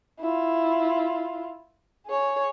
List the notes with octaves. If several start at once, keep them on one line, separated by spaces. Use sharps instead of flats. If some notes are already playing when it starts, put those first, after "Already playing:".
E4 F4
G#4 C#5